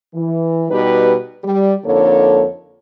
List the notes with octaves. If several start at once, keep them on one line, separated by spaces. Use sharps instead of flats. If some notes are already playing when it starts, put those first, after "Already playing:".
E3
B2 G3 D#4 G4 B4
G3
F2 D3 A#3 D#4 A4 C#5